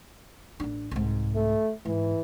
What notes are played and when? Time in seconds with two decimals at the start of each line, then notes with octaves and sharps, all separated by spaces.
0.60 A1 D4
0.91 C2 G#2
1.35 A3
1.85 G#2 E3